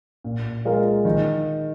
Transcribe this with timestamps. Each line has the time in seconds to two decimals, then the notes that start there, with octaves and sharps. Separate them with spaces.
0.24 A#2
0.65 G#3 F4 A#4
1.05 D#3